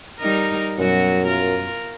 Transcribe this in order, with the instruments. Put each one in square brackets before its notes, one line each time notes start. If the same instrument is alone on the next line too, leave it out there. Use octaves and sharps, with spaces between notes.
[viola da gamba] G3 D#4 A#4
[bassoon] F#2 [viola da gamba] B2 F#3 F#4
[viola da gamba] F4 A#4